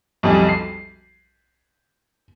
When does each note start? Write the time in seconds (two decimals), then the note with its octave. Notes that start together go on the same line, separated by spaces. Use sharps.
0.23 B1 F2 G3 G#5
0.49 C7